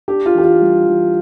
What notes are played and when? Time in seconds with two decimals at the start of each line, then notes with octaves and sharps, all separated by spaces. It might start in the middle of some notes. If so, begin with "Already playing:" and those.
0.08 D4 G4
0.26 F4
0.35 E3 G4
0.44 F4
0.61 G3
0.87 E3